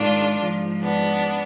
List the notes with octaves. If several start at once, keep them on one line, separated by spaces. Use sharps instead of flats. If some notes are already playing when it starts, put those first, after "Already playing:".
Already playing: G#2 D#3 D4 F4
G#2 F3
B3 D4